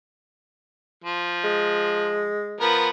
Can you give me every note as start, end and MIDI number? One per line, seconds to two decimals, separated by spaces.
1.04 2.33 53
1.44 2.70 56
2.61 2.89 53
2.61 2.89 59
2.61 2.89 70